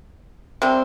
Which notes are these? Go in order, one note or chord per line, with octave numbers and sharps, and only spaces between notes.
C3 G3 C4